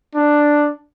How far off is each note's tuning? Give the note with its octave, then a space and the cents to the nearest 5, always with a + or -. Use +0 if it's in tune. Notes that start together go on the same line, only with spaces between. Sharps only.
D4 +5